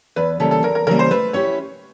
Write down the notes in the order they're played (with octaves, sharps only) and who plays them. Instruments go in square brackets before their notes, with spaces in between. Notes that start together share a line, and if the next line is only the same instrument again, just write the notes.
[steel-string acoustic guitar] E2 [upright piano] B4
[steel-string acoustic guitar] C#3 E3 G3 A#3 [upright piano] A4
[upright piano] A4
[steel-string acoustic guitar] E2 [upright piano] A#4
[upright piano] A#4
[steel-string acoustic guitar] C#3 E3 G3 A#3 [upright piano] A#4
[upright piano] C5
[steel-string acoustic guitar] A3 [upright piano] B4
[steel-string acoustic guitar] C#4 E4 G4 [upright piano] C#5